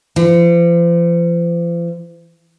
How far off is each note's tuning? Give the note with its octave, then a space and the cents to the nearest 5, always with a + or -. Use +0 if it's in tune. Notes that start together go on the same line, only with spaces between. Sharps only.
F3 -40